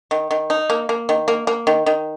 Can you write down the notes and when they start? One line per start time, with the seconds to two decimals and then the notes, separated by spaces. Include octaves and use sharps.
0.11 D#3
0.31 D#3
0.50 D#4
0.70 A#3
0.89 A#3
1.09 D#3
1.28 A#3
1.47 A#3
1.67 D#3
1.86 D#3